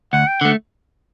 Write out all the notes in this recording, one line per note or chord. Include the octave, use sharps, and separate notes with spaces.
D2 F#5
G5
D3 A3 F#5